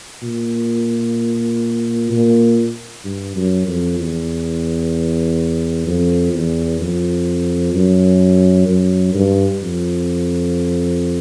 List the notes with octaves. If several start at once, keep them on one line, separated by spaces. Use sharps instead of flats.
A#2
A#2
G2
F#2
F2
E2
F2
E2
F2
F#2
F#2
G2
F2